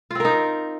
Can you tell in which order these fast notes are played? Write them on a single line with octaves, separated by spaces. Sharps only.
F4 C4 A#4 D#4